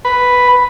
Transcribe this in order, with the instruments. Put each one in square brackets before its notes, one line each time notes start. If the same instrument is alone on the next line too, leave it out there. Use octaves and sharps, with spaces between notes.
[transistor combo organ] B4